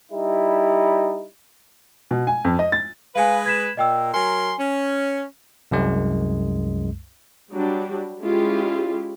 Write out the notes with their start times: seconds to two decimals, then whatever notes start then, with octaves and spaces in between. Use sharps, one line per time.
0.11 G3 D#4 E4
2.11 B2
2.27 G#5
2.45 F2
2.59 D#5
2.72 A6
3.15 G#3 B4 F5 G#5
3.46 G#6 B6 E7
3.77 A#2 D#5 G5 E6
4.14 F#3 A#4 G#5 C6
4.59 C#4
5.71 C2 F#2 G#3
7.51 F#3 G3 D4
8.21 G#3 C#4 E4 F4 G4